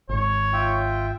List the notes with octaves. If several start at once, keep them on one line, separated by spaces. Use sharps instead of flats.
G#1 C#5
F4 E5 G5